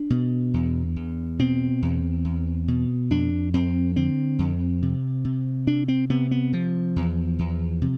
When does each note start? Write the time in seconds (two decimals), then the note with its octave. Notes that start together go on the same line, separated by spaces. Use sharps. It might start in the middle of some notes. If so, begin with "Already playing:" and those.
Already playing: D4
0.10 B2
0.54 E2
0.96 E2
1.39 B2 C4
1.82 E2
2.25 E2
2.68 B2
3.10 F2 D4
3.54 F2 C4
3.96 D3 C4
4.39 F2
4.82 C3
5.25 C3
5.67 C3 D4
5.88 C4
6.10 C3 B3
6.31 B3
6.53 C3 F3
6.96 E2
7.39 E2
7.82 C3